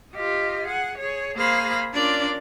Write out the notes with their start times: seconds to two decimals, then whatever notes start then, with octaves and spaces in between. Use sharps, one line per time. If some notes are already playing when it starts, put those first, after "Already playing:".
0.14 F4 G4 D#5
0.66 G#4 F#5
0.98 G#4 C#5
1.37 A#3 G#4 C5 F5 B5 A#6
1.94 C#4 D4 F4 A#4 D5